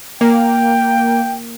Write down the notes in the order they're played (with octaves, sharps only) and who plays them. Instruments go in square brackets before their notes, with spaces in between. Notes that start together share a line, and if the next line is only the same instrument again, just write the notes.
[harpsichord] A#2 [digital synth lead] A#3 [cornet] G5